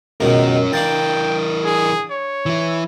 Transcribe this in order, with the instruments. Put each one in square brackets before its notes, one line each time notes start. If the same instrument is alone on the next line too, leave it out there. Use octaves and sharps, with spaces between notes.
[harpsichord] C#2 B2 D#3 [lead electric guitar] C#4 A#4
[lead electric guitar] E3 A#4 [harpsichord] D4 F5 A5 [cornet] G5
[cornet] G#4
C#5
[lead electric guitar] E3 E4